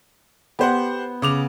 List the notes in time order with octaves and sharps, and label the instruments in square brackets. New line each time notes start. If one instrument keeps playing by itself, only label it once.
[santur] B3 [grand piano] G4 C5 F#5
[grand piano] C#3 D6 F7